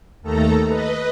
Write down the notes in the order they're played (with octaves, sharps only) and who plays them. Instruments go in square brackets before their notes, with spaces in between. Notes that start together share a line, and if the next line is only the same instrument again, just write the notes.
[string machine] D#2 D#3 A3 A4 A#5
B4 D#5